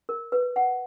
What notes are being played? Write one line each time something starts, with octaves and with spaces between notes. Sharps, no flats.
A#4
B4
F#5